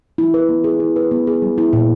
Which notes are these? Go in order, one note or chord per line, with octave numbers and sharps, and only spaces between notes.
E4
B4
B3
G#4
E4
B4
B3
G#4
G3
E4
A#2